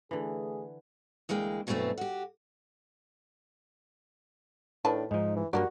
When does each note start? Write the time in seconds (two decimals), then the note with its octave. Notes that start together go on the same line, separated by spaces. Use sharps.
0.11 D3 E3 A3 G#4
1.29 D2 E3 G#3 A#3 G5
1.67 G2 B2 E3 F#3 A3 C4
1.98 F#4 G4
4.85 A2 D#3 D4 B4 A5
5.11 G#2 F3 D#4
5.36 E3
5.53 G2 F#3 A#3 F#4 G4 A#4 D5